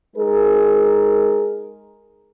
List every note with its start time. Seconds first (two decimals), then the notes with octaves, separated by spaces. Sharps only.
0.16 G#3 D#4 G#4 A#4